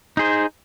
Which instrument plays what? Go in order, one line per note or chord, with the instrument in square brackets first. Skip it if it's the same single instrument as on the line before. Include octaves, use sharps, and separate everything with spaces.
[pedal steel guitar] D#4 G#4 C5